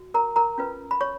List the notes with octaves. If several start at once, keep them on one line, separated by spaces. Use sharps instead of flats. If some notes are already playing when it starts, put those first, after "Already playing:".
Already playing: F#4
A#4 A#5
A#4 A#5
C#4 F4 B4
B5
C#5 C#6